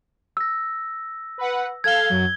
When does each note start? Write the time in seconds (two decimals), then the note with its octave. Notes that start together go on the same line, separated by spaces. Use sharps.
0.37 E6 A#6
1.38 B4 F#5
1.84 A4 F5 G#6 G7
2.10 F#2 F#3